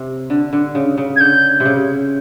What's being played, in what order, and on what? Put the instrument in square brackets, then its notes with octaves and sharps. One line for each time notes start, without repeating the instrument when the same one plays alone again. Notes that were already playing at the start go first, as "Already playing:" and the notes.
Already playing: [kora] C3
D3
D3
C#3
C#3
[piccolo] G#6
[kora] D3 [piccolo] G6
[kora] C3
C#3